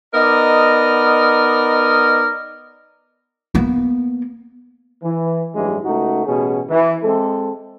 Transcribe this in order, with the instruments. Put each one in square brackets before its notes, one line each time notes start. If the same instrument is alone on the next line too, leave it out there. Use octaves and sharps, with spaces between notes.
[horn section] B3 D#4 A#4 D5 D#5
[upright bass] A#3 B3
[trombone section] E3
A1 G2 E3 F#3 G#3
C#2 A3 D#4 F#4
A1 B2 C#4 G#4
E3
G#3 C4 A4